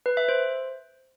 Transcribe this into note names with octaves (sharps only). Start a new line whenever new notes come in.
B4
E5
C5